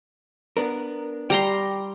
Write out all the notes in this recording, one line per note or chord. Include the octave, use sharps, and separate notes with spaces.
B3 D4 A#4
G3 G5 A#5 C6